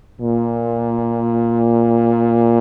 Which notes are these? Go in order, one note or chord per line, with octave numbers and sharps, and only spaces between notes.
A#2